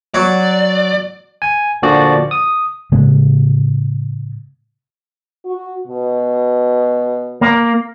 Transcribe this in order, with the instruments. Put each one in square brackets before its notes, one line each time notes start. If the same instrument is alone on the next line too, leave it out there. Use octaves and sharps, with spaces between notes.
[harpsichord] F#3 C#5 [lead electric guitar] D5
[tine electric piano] G#5
A#2 D3 F3 F#4 D5
D#6
[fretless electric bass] A2 C#3 G#3 A#3
[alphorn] F#4
B2
[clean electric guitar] A#3